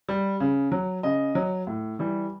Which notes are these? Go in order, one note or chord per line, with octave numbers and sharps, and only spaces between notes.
G3
C#3
F#3
C#3 D#5
F#3
A2
E3 G3